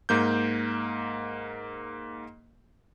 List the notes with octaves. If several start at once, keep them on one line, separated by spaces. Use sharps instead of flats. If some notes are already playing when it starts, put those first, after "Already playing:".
G#2 A#3 G6